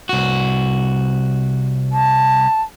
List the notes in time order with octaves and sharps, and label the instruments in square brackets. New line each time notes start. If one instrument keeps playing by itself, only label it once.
[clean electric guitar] C2 F#4
[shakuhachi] A5